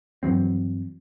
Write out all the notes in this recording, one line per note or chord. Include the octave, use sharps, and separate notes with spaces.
G2 E3 F#3 C4